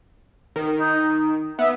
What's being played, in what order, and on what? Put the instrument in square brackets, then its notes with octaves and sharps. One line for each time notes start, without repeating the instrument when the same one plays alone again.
[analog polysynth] D#3
[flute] D#4
[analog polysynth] B3 [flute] E5